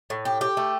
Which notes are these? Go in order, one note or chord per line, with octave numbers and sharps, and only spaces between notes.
A2
G4
G4
A3